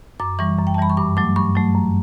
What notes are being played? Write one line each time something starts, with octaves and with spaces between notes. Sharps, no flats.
F#2 D6
E3 G3 C#6
F#2
G5
A5
E3 G3 B5
C#6
G2 D6
F#3 A3 D6
G2 C#6
F#3 A3
F#2